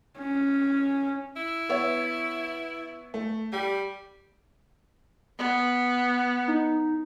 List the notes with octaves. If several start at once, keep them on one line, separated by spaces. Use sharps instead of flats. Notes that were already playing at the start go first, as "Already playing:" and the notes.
C#4
E4
B3 C#5 E5
A3
G3 G4
B3
D#4